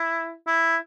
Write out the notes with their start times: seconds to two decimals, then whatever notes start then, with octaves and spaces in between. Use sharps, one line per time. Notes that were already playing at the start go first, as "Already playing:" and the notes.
Already playing: E4
0.47 E4